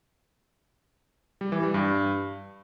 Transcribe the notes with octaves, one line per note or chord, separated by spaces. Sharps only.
G3
E3
G3
G2